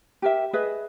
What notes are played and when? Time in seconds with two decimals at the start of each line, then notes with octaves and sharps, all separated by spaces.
0.22 G4 A#4 E5
0.53 G#4 B4 D#5 E5